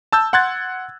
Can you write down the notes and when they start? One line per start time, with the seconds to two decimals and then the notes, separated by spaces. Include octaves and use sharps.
0.12 A5 E6 G6
0.33 F#5 C6 F#6 G#6 A6